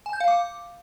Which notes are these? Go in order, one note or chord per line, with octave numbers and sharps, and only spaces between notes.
G#5
G6
F5
D6